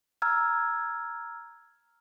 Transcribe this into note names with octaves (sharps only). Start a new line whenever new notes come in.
A#5 E6 F6 G#6